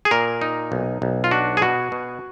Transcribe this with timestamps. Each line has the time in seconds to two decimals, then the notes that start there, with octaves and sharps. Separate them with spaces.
0.05 G#4
0.11 A#2 A#4
0.42 D#4
0.72 B1
1.02 B1
1.24 F4
1.31 D4 F#4
1.57 G#4
1.62 B2 F#4
1.92 B2